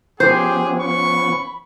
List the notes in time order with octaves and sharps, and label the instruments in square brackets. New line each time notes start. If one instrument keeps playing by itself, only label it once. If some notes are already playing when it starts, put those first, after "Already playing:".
[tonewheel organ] F3 B3 C#4 [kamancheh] G4 [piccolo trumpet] G#4 [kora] C5
[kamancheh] B5 [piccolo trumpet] C#6